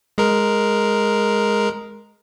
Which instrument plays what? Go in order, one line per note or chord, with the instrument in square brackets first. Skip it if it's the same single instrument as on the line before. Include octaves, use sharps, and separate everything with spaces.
[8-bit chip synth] G#3 A#4